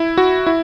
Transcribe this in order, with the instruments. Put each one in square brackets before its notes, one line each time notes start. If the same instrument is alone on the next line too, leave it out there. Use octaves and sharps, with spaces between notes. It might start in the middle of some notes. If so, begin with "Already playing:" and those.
Already playing: [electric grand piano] E4
F#4
E4